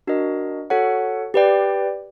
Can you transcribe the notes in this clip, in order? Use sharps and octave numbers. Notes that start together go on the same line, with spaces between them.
D4 F#4 A#4 D#5
F#4 A4 C#5 F#5
G4 B4 D5 G5